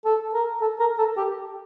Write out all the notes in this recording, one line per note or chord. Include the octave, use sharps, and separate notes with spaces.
A4
A#4
A4
A#4
A4
G4